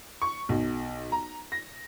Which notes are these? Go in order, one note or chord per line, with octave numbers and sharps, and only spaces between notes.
C#6
B1
A#5
A#6